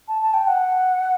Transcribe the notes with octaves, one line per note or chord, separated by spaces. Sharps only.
A5
A5
G5
F#5